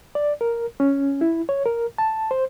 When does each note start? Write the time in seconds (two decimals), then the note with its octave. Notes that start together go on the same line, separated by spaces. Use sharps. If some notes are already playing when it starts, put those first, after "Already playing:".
0.15 D5
0.41 A#4
0.80 C#4
1.21 E4
1.49 C#5
1.66 A#4
1.98 A5
2.31 C5